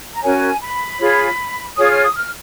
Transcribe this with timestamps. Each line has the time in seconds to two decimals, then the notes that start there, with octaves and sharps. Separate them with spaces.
0.14 A#5
0.22 C#4 F#4 A#4 C#5 G#5
0.61 B5
0.99 F4 G#4 C#5
1.77 F4 G#4 C#5 D#6
1.90 F6
2.03 D#6
2.15 F6